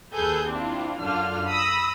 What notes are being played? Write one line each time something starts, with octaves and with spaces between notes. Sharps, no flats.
D#2 G#4 A4 B4 G6
C4 D4 E4 F4
F#2 D3 D4 F4 F6
B5 D#6 E6 A#6